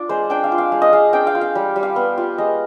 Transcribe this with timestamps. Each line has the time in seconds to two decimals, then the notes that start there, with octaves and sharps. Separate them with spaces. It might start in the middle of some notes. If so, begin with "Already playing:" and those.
Already playing: D4 F4 D5
0.09 G#3 C5
0.30 D4 G5
0.44 F5
0.52 F4
0.58 F5
0.72 G#3
0.82 D#5
0.93 G#3 F5
1.13 D4 G5
1.27 F5
1.35 F4
1.41 F5
1.55 G3
1.76 G3
1.83 F5
1.96 B3
2.18 F4
2.38 G#3 D#5